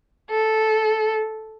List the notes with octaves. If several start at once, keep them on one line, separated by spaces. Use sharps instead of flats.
A4